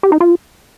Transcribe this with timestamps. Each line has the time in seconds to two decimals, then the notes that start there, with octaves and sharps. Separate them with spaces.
0.03 G4
0.12 D#4
0.20 F4